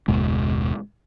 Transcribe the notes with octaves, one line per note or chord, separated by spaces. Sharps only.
F#1 D#2 B2 G#3